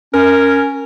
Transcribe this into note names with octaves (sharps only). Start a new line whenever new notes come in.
C#4 A#4